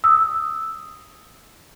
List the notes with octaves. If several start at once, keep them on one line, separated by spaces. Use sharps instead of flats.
D#6 E6